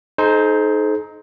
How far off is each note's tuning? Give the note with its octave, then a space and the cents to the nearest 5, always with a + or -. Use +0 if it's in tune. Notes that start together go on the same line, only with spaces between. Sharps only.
D#4 +0 A4 -45 C5 +0